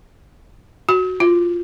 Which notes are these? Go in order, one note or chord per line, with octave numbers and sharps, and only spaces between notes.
F#4
F4